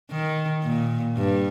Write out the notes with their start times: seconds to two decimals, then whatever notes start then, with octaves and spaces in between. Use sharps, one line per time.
0.11 D#3
0.64 A#2
1.17 G2